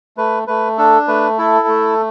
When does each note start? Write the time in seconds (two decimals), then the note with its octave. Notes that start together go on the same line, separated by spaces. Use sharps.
0.17 A3 B4
0.47 A3 B4
0.78 D4 A4
1.08 A3 B4
1.38 E4 A4
1.68 A3